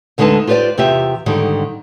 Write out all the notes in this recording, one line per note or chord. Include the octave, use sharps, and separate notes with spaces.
D2 D3 G#3 D#4 B4 A5
F4 G4 B4 C5 D5
E2 C3 F4 G4 E5
G#2 D3 D#3 G3